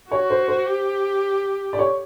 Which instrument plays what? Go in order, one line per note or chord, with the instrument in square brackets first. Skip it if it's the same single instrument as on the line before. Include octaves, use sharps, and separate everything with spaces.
[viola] F#4 [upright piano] C#5
[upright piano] C5
C5
[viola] G4
[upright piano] D5
C#5